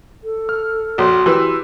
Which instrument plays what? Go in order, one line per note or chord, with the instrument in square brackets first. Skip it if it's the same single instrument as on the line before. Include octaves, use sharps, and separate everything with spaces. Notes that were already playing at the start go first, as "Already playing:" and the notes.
[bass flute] A4
[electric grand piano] F6
[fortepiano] A#1 [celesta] F#4 C#5 C6
[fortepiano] E3 [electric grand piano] G4 B4 E6